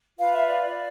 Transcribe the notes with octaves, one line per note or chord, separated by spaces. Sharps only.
F4 B4 F5
E5
D5
D5